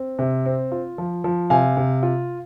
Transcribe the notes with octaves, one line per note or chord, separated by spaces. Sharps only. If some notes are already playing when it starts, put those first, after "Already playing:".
Already playing: C4
C3
C4
F4
F3
F3
C3 F5 G#5
C3
F4